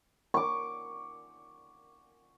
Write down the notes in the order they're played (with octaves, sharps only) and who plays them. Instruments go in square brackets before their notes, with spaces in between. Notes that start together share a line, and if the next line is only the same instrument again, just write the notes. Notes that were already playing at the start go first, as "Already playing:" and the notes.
[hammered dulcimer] C#6 D6